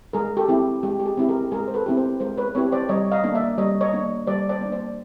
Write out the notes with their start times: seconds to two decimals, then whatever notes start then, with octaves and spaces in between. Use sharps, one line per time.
0.13 G#3 G#4 A#4
0.37 G4 A4
0.48 C4 E4 G4
0.83 G#3 G4
1.00 G4
1.06 G#4
1.17 C4 E4 G4
1.28 G#4 A#4
1.52 G#3 G#4 A#4
1.68 C5
1.74 A4 B4
1.86 C4 E4 G4
1.97 A#4 C5
2.20 G#3 A#4 C5
2.38 B4 C#5
2.55 C4 E4 G4 B4 C#5
2.72 C5 D5
2.89 G3 C#5 D#5
3.12 D#5 F5
3.24 A#3 D4
3.35 D5 E5
3.58 G3 C#5 D#5
3.81 C#5 D#5
3.93 A#3 D4
4.27 G3 C5 D5
4.49 C5 D5
4.61 A#3 D4
4.72 C5 D5